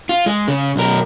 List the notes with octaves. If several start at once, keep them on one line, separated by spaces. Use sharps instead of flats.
F4
G#3
C#3
B1 A#4